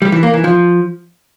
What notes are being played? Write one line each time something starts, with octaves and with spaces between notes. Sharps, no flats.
G3
E3
A#3
E3
F3